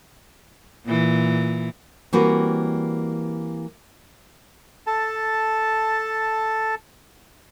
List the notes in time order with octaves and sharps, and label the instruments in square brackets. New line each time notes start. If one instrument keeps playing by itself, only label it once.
[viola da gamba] A#2 E3
[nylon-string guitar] E3 G3 A#3 C4 F#4 B4
[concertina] A4 A5